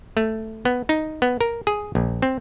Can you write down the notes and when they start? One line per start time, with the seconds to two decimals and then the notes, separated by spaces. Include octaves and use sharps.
0.17 A3
0.65 B3
0.89 D#4
1.22 B3
1.41 A#4
1.67 G#4
1.95 A#1
2.22 C4